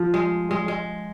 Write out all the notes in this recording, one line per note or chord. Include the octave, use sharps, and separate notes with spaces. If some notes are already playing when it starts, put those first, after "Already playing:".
Already playing: F3
G#3
G#3
G#3